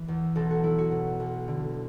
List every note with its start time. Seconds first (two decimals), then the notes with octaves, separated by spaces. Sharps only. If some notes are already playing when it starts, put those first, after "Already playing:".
Already playing: E3
0.08 E2
0.36 B1 A4
0.51 F#4
0.63 F#3 E4
0.78 F#4
0.92 B2
1.20 B1
1.48 D3